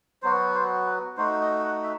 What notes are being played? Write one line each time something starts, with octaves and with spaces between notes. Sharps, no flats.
F#3 B3 F#4 C5
C5
B4
A3 D#4 F#4 C5
D#5
F#5
E5